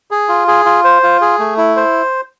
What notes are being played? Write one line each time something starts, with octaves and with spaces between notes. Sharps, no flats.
G#4
F4
G#4
F4
C5
F4
G#4
A3
E4
C5